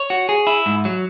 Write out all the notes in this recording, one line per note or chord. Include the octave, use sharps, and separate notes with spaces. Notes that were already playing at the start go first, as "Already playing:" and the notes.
Already playing: C#5
F#4
G#4
E4
G#2
F#3